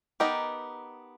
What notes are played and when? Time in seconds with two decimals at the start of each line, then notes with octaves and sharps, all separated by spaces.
0.20 B3 D#4 G4 A#4 D#5